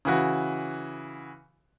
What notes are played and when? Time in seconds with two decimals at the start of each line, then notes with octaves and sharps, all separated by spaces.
0.05 C#3 E3 F#4